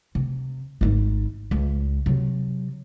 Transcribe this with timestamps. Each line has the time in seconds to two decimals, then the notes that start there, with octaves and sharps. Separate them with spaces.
0.15 C3
0.81 G#1 D#4
1.51 C#2
2.06 C3 F#3